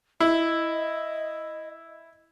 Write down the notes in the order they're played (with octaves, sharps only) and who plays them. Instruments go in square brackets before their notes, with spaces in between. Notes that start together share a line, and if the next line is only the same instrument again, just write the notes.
[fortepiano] E4 [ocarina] D#5